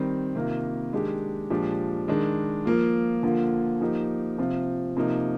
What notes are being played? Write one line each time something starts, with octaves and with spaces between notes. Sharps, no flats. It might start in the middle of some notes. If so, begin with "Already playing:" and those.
Already playing: D#3 G3 C4
C3 D#3 A#3 F4
D#3 G#3 D4 G4
A#2 F3 G#3 D4 G4
D#3 G#3 D4
F3 A#3 F4
D3 F3 A#3 F4
F3 A#3 D#4 G4
C3 F3 C4 F4
C3 F3 A#3 D#4